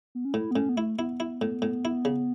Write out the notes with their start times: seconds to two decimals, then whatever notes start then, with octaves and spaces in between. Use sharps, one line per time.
0.15 B3
0.25 C#4
0.34 A2 E4
0.51 B3
0.56 A2 C#4
0.69 B3
0.76 A3 E4
0.98 B3 E4
1.20 E4
1.42 A2
1.62 A2
1.85 E4
2.05 C#3